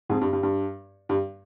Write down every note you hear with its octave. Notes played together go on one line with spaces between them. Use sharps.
F2 G#2
G2
G2
G2
G2